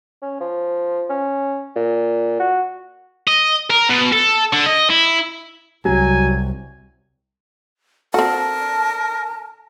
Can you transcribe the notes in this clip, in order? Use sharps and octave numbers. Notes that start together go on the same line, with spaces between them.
C#4
F3
C#4
A#2
F#4
D#5
A#4
B2
A4
D3
D#5
E4
C2 F#3 G#5
C4 F#4 A4 A#4 A5